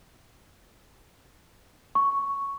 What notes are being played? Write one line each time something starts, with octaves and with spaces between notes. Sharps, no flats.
C#6